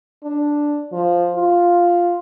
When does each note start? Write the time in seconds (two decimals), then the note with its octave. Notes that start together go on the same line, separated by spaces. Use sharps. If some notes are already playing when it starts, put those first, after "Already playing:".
0.23 D4
0.93 F3
1.36 F4